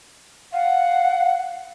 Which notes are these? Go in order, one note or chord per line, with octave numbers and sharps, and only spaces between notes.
F5 F#5